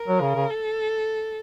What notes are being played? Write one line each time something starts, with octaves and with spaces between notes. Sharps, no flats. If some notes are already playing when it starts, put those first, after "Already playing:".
Already playing: A#4
F#3
C#3
C#3
A4